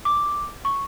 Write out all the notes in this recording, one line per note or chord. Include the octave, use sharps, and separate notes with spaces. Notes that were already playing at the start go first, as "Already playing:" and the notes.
D6
C#6